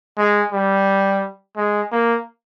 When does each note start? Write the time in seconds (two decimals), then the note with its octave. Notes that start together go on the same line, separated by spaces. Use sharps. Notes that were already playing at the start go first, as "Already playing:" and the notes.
0.18 G#3
0.52 G3
1.57 G#3
1.92 A#3